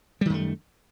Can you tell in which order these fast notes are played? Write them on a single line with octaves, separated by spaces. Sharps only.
G3 D#3 F#2 A3